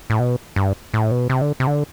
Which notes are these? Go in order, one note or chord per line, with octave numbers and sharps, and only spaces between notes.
A2
B2
G2
A2
B2
C3
D3
C3
D3